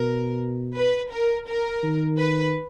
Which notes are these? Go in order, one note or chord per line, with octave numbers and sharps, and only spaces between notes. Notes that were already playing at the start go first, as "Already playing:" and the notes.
Already playing: B2 A#4
B4
A#4
A#4
D#3
B4